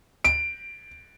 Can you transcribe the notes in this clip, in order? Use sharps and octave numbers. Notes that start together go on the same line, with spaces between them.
D7